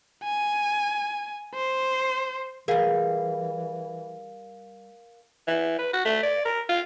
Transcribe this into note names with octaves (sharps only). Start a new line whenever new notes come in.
G#5
C5
E3 G3 G#4 A#4 F5
E3
B4
F#4
A3
D5
A#4
F4